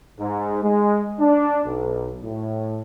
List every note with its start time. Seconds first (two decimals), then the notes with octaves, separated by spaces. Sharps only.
0.20 G#2
0.63 G#3
1.19 D4
1.65 B1
2.24 A2